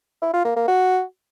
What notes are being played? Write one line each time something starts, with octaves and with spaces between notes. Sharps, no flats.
E4
F4
A#3
A#3
F#4